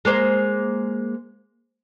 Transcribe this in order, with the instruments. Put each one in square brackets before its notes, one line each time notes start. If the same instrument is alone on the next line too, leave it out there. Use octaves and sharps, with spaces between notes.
[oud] G#3 A#3 C5